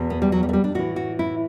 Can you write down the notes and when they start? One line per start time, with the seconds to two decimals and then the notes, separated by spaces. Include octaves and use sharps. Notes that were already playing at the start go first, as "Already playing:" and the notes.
Already playing: E2 B2
0.10 B3
0.22 G3
0.32 F#3
0.43 G3
0.49 A3
0.53 G3
0.64 D4
0.75 A2 E3 F#4
0.96 F#4
1.19 E4